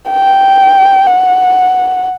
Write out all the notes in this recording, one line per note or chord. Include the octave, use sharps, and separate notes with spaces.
G5
F#5